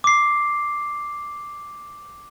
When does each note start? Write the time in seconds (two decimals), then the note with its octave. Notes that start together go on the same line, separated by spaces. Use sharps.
0.04 D6 C7